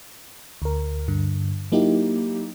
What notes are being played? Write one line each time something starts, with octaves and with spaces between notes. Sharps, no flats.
D2 A#4
G2 D3
F#3 A#3 D#4 E4 G4